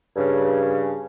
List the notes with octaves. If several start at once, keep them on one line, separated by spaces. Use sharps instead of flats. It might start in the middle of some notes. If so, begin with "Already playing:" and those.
G2 C#3